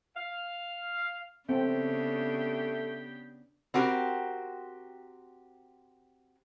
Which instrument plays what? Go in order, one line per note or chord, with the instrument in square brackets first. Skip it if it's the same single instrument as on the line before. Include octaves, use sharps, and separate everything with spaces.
[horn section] F5
[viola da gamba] C#3 B3 D4 [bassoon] A3 [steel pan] C4 [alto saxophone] G4
[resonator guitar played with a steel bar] C4 F#4 G4 A#4